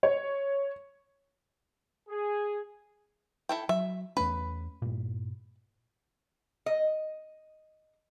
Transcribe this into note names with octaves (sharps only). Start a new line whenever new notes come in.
C#5
G#4
E4 A4 G5
F#3 E5
E2 A3 C#4 B4
G2 A#2
D#5